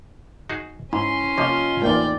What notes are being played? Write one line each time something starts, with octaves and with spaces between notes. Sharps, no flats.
D#4 F#4 G#4
G#2 C#4 E4 C6
C3 F3 A#3 F4 C#5 D#5
A#1 E2 A2 A#3 D#4 D5 G5